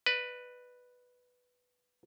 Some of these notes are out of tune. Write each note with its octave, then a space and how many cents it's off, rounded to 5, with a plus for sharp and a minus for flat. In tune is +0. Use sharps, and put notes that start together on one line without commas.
B4 +0 D5 +40